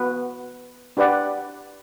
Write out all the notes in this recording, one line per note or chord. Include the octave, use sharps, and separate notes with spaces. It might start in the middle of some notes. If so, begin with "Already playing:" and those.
Already playing: B3 F#4 B4
D4 G4 B4 D5 F#5